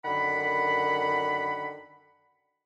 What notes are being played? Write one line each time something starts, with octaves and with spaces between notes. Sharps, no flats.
F#2 D3 D#3 F#5 B5